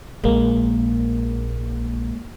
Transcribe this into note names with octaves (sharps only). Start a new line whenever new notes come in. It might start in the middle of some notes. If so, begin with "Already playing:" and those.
A#1 G#3 A#3